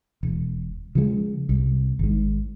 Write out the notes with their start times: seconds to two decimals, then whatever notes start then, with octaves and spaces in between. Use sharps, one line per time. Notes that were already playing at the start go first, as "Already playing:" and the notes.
0.23 E1
0.95 C#3 F3 G#3
1.49 C2
1.99 G#1 G#2